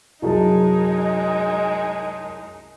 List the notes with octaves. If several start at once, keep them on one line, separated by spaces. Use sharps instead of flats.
C2 F#2 G#3 D#4 F#4 G#4 A5